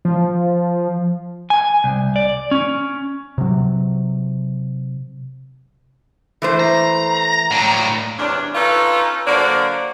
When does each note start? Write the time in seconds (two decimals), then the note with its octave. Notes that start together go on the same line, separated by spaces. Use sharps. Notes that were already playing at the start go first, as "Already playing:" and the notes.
0.05 F3
1.50 G#5
1.84 C2
2.16 D5
2.51 C#4
3.38 C3 F#3
6.42 E3 A3 C5
6.60 A#5
7.51 A2 D4
8.18 E2 C3 C#4 D4
8.55 C#4 D#4 F4 A4 B4
9.27 D3 F#3 A#3 F#4 C5 D5